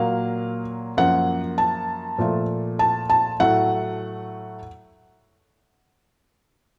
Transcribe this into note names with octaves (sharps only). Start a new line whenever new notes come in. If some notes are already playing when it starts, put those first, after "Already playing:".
Already playing: A#2 F#3 A#3 F5
F#2 F3 A#3 F#5
A5
A#2 F3 A3
A5
A5
A2 F#3 A3 F#5